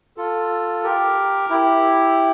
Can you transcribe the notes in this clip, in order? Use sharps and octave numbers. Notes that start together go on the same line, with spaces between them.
F4 A4
G4 A#4
E4 G4